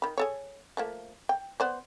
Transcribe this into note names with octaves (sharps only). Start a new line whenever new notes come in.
D#3 B5
G#4 A4 C#5
F3 A3 A#3
G5
B3 C5 D5